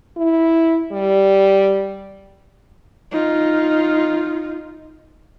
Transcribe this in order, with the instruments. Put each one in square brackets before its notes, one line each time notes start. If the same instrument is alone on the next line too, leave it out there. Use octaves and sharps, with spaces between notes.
[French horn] E4
G3
[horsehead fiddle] D#4 F4